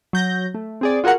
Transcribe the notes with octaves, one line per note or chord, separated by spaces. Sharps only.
F#3 G6 A#6
A3
C4 G#4 D5
F4 F#4 G#4 A#4 F#5